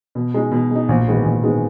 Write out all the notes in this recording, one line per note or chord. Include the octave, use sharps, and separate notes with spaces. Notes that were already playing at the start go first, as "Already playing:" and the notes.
B2
G#3 D#4
B2
G#3 D#4
A#1
G#2 D#3 G#3 B3
A#1
G#2 D#3 G#3 B3